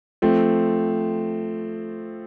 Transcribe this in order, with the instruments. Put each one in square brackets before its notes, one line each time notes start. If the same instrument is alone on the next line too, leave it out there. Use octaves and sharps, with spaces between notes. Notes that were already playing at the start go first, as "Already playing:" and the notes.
[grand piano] F3 A3 C4